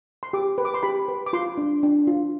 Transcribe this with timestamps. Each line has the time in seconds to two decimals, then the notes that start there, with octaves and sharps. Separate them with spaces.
0.23 C6
0.33 G4 D6
0.58 B4
0.65 D6
0.74 C6
0.83 G4 B5
1.08 B4
1.26 D6
1.33 F4 C6
1.58 D4
1.83 D4
2.07 F4